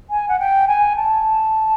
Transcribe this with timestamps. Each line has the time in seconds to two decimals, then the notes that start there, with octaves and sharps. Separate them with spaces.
0.09 G#5
0.28 F#5
0.39 G5
0.67 G#5
0.96 A5